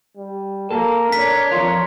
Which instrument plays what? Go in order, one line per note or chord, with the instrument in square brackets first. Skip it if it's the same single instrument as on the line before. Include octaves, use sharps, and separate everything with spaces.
[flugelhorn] G3
[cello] A#3 [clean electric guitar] A4 [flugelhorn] A#4
[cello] D4 C#5 [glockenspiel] B6
[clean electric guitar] F2 F4 [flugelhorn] A#4